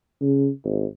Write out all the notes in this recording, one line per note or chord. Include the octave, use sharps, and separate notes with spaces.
C#3
G#1